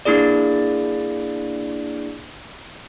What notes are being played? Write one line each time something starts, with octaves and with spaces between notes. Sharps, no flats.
A#3 D4 E4 G#4 D5